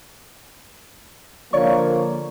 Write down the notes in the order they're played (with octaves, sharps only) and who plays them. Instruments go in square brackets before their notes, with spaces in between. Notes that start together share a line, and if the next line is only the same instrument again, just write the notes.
[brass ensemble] D3 F3 A#3 [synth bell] C#5 D5 C#6